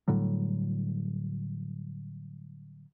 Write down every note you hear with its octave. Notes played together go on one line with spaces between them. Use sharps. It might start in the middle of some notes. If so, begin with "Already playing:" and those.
A2 D3 F#3 G3